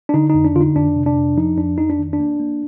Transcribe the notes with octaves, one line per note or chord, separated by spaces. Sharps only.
D4
D3 D#4
F2 D#4
D4
D3 F4
D#4
F2 D4
C3
D4
F2
F3 D#4
F2 D4
F2 D#4
D4
D#3
D4
A#3
A#3